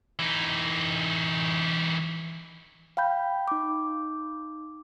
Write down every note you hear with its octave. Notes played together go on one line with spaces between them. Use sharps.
E3 D#4
F5 G5 B5 G6
D#4 D6